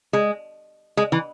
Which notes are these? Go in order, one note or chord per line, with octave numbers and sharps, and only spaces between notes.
G#3
G#3
E3